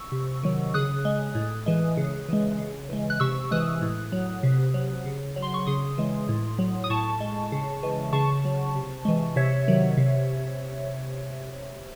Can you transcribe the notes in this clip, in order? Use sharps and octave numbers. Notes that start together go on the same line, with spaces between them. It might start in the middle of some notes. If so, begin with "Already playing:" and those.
Already playing: C#6 E6
C3
D#3 F#3
C#3 D#6 F#6
G#3
A2
E3 G#3
C#3
E3 G#3
C#3
E3 G#3
F#6
C3 C#6 E6
E3 G#3 D#6 F#6
A2
F#3
C3
F#3
C#3
F#3
C6
C#6
C#3 C6 D#6
E3 G#3
A2
F#3
D#6
A2 A5 C#6
G#3
C#3
E3 G#3
C#3 A5 C#6
F#3
C3
E3 G#3
C3 C#5 E5
D#3 F#3
C3